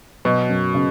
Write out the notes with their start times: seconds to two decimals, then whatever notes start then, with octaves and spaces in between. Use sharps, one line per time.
0.25 B2 F#3
0.49 F#2
0.74 C#3